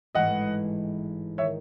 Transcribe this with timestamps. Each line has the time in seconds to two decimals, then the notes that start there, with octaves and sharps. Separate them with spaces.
0.15 A1 G#2 E3 G#3 D#5 F#5
1.38 D#3 C#5 E5